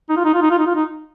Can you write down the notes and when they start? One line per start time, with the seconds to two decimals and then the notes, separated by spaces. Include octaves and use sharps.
0.09 D#4
0.17 F4
0.25 D#4
0.34 F4
0.42 D#4
0.51 F4
0.58 D#4
0.67 F4
0.75 D#4